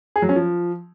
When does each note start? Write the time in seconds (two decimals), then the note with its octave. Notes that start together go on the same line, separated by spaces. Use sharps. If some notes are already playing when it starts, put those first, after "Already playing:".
0.16 G#4
0.22 F#3
0.29 C#4
0.36 F3